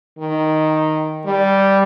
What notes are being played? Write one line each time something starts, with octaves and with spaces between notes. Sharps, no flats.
D#3
G3